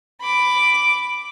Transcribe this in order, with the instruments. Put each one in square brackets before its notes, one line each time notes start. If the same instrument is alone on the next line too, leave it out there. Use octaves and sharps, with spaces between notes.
[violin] B5 D6